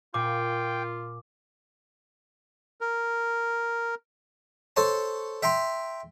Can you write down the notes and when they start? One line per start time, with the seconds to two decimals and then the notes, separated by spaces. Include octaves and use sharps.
0.14 A#2 F4 G5 D6
2.81 A#4
4.76 A4 C5 C#5 A5
5.43 E5 G5 A#5 C6